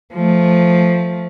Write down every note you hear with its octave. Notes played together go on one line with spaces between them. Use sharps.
F3 A3